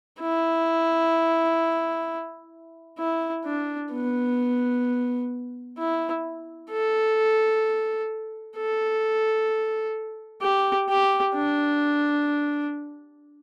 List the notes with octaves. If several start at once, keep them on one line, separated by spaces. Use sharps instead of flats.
E4
E4
D4
B3
E4
A4
A4
G4
G4
D4